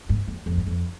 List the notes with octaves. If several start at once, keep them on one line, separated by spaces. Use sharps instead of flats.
G2
F2
F2
G2
F2